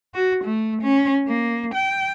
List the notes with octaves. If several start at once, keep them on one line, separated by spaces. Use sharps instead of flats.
F#4
A3
C#4
A#3
G5